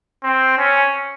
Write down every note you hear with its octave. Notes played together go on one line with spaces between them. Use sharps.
C4
C#4